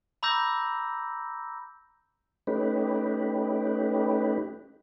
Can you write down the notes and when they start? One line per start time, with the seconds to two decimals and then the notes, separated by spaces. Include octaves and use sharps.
0.23 A#5 B5 D6 E6 G6 A#6
2.47 A3 C#4 D#4 G4 B4